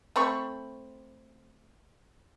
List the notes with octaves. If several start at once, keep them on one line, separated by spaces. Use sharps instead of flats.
A3 C4 B5 C#6